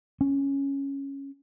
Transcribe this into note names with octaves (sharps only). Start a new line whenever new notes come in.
C#4